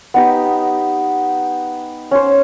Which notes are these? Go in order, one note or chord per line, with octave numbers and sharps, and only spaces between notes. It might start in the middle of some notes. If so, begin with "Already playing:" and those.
B3 D#4 G4
C#4 C5